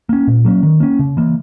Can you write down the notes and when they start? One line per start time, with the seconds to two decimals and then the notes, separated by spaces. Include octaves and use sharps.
0.09 A#3 C#4
0.27 A#2
0.45 F#3 A#3 C#4
0.63 D#3
0.80 A#3 C#4
0.99 C#3
1.17 E3 A#3